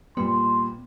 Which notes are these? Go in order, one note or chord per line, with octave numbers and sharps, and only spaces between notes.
A#2 G3 B3 C6